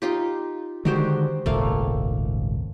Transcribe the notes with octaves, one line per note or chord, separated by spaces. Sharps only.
D#4 F4 G4
D3 D#3 G#3 F#4 G4 C5
D#1 G#1 C#2 A3 A#3 F5